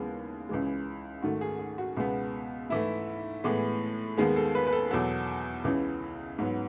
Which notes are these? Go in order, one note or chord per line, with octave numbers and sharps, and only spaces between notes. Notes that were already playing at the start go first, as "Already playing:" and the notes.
Already playing: D#2 C#3 E3 G#3 B3
C#2 C#3 E3 G#3
G#2 D#3 A3 F#4
G#4
G#4
F#4
C#2 B2 G#3 B3
G#2 E3 A3 E4
A2 E3 G#3 B3
D#2 D#3 G#3 B3 G#4
A4
B4
B4
A4
E2 B2 F#3 A4
C#2 C#3 E3
G#2 F#3 B3